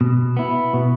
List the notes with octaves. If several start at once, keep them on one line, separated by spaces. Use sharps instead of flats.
B2
B3 E4
B2